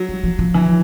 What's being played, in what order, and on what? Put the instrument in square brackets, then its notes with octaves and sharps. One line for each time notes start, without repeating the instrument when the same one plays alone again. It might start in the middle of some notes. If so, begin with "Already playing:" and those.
Already playing: [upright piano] F#3
[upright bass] G3
F3
F3
[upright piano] E3